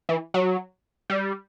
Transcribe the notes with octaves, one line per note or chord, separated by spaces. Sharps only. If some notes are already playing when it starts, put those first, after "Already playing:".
E3
F#3
G3